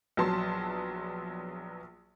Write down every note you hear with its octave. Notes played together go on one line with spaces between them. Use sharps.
A#1 F#3 B3 A5 C6